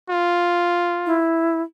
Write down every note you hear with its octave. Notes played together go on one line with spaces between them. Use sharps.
F4
E4